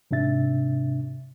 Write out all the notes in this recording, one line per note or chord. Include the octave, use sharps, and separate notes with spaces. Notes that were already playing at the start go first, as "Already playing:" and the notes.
G#2 C3 D4 E5 A6